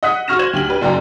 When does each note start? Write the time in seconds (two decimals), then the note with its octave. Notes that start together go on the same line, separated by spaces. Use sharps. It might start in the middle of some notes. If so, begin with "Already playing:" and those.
0.03 D#5 F#5 D#6 F#6 B6
0.28 F#4 C#6 F6 A#6 E7
0.39 C5 G#6 E7 F#7
0.53 D2 G4 F#7
0.69 G4 B4
0.81 F#1 F#2 D5 G5 A#5